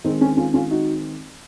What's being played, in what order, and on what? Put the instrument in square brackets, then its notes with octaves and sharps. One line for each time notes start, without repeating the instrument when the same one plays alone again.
[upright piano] D#3 G#3 C4 D#4
C#4
C#4 F4
C#4 F4
D#4 F#4